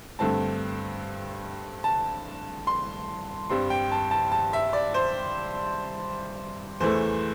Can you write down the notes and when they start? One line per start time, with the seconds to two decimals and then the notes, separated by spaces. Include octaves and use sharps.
0.19 G2 D3 A3 C4 A5
1.84 A5
2.67 C6
3.50 G2 G3 C4 C6
3.70 G5
3.92 A5
4.11 A5
4.32 A5
4.53 E5
4.73 D5
4.94 C5
6.80 E2 E3 A3 C5